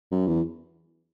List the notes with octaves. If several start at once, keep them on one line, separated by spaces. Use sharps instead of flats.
F#2
E2